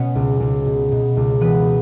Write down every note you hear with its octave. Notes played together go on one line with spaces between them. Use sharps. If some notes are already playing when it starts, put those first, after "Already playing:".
Already playing: B2 B3 C#4 B4 C#5
C#2
C#2
B2
B2
C#2
E3 B3 B4